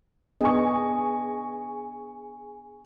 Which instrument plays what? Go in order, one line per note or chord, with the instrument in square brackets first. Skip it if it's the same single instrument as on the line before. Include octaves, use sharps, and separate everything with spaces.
[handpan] B3 D4 D#5 [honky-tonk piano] G#4 G#5 C#6